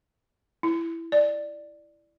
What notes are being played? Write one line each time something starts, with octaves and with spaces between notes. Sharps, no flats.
E4
D5